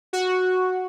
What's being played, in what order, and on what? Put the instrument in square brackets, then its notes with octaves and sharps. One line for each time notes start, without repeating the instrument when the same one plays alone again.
[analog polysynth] F#4